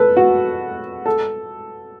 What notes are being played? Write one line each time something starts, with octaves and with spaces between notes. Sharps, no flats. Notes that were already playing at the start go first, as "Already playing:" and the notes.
Already playing: A4 B4
F#4
A4